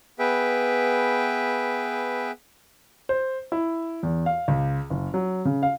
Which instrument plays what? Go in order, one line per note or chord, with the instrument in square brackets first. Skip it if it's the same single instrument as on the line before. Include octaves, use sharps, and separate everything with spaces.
[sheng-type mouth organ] B3 G#4 B4 E5 G5
[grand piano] C5
E4
E2
F5
C#2
F#1
F#3
C#3
F5